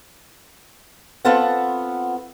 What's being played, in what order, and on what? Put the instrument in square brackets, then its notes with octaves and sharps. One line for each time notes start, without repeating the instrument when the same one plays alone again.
[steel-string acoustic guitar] B3 C4 F4 A4 B4 F#5